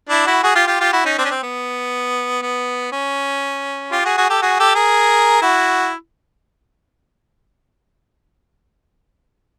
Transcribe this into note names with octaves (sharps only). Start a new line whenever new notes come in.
D4 E4
E4 F#4
F#4 G#4
F4 G4
F4 G4
F4 G4
E4 F#4
C#4 D#4
C4 D4
C#4
C4
B3
B3
C#4
F4 G4
F#4 G#4
F#4 G#4
G4 A4
F#4 G#4
G4 A4
G#4 A#4
E4 F#4